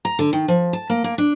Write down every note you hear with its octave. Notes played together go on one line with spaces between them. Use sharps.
A#5
D3
D#3
F3
A5
A#3
A#3
D4